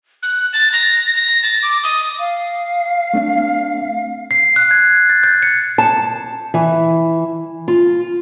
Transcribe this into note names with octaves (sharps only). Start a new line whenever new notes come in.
F#6
A6
A#6
A#6
A6
D6
D#6
F5
A3 C4 D4
C7
F#6
G#6
A6
G6
C#7
A5
E3
F4